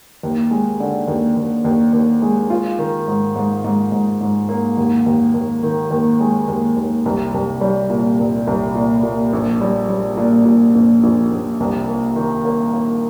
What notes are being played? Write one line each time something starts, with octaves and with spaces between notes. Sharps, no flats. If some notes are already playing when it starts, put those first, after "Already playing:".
D#2
G#3
D3
D#2
D#2
D#2
D#2
G#3
F4
D#3
G#2
G#2
G#2
G#2
G#2
A#3
D#2
D#2
D#2
D#3
D#2
G#3
D#2
D#2
C2
C2
G3
A#2
C2
C2
A#2
A#2
A#1
G3
G3
A#2
A#2
A#1
A#1
A#1
C2
A#3
D#3
A#3
A#3